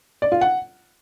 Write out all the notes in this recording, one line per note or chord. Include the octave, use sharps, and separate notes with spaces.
D5
F4
F#5